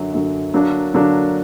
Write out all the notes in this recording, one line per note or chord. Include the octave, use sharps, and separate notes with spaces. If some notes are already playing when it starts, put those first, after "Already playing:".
Already playing: F#2 D3 F#3
F#2 D3 F#3
D3 F#3 A#3 D4
D3 F#3 A#3 D4